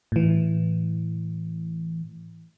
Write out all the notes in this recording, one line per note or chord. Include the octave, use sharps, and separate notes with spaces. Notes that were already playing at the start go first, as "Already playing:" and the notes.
A2 E3